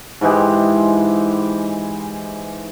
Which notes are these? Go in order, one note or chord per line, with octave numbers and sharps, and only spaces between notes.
G#2 E3 G#3 G4